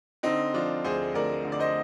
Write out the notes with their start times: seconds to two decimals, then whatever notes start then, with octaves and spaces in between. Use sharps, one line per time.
0.23 D3 C4 D#4
0.53 F3 D4 F4
0.84 D2 G#4 C5
1.14 D2 A#4 D5
1.44 D3
1.52 D5
1.59 C5 D#5